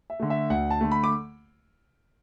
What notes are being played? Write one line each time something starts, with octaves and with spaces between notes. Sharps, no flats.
E5
D3 A3
E5
D2 F#5
A5
D3 A3
B5
D6